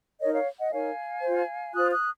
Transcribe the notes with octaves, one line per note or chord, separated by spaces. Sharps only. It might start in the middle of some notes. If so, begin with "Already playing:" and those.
D#4 A#4 C#5 D#5
C#5 F5
D#5 F#5
D#4 A#4 C#5 F5 G#5
F4 C5
F4 C5 D#6 F#6
D#6 F#6